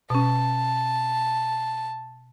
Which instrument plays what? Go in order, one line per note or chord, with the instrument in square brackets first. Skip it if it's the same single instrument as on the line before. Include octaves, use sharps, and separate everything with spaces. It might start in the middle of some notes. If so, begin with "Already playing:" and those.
[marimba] B2 C#4 [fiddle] A5